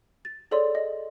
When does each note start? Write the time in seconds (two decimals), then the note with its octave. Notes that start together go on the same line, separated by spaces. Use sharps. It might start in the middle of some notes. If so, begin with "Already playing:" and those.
0.25 A6
0.51 G#4 A4 C#5 D5 C6
0.75 D#5